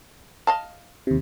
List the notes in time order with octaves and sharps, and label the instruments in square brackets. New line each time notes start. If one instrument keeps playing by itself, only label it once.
[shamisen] D#5 F5 A5
[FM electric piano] D#2 C3